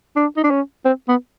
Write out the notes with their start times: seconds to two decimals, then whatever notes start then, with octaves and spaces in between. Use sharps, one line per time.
0.16 D4
0.37 D#4
0.44 D4
0.51 C#4
0.85 C4
1.09 B3